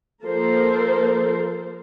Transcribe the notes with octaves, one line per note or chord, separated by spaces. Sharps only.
F3 A#3 A4 A#4 C5